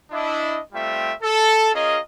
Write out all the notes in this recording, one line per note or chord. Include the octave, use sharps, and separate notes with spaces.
D4 E4 D#5
G3 A3 C4 F4 E5 G5
A4
C#4 F4 G#4 A#4 D#5